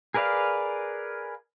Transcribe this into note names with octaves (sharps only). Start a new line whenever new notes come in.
G#4 A#4 B4 D5 F5